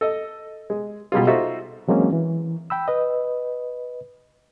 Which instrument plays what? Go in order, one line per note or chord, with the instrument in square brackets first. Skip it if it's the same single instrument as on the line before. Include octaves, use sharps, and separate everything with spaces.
[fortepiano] A4 D#5
G#3
B2 G3 G#3 F4
D#4 F4 F#4 A4 C5 E5
[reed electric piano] E3 F#3 G#3 A#3 C4 C#4
E3
G5 B5 E6
B4 D#5